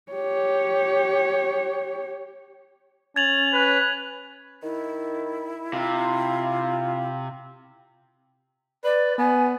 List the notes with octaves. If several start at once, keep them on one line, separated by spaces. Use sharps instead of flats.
G4 C#5
C#4 G#6 A6 F7 F#7
B4 F#6
D#3 E4
C3 F4
B4 D5
B3 G#5